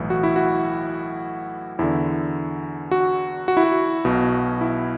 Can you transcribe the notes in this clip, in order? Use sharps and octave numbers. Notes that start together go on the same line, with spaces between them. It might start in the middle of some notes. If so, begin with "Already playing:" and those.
Already playing: B1 A2 E3
F#4
E4
F#4
E2 D3 E4
F#4
F#4
E4
F#4
B1 B2
E4